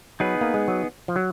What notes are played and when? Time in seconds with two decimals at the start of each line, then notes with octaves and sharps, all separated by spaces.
0.20 F#3 B3 D#4 G#4 B4
0.41 A#3
0.54 G#3
0.68 F#3
1.08 F3
1.16 F#3